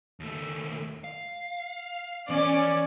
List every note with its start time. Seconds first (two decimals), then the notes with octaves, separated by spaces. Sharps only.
0.20 D#2 A3
1.04 F5
2.30 E3 C#4 D5